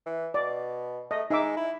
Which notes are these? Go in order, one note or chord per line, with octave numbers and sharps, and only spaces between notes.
E3
B2 D5
A3 D#5
G#3 D#4 E5 D6
E4